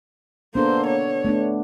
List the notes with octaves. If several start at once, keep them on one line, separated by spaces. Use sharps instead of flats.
A#3 B3 D4 A4 C5
C#5
A3 B3 D4